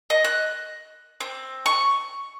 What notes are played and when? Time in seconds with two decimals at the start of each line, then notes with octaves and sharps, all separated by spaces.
0.10 D#5
0.24 F#6
1.20 C4
1.66 C#6